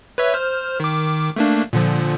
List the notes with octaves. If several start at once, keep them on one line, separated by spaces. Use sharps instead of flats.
B4 C#5 E5
C5 F6
D#3 D6
A3 A#3 D4
A#2 D3 F3